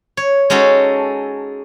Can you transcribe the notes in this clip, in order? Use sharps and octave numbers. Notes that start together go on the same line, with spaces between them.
C#5
G#3 C#4 D#4 F#4 A4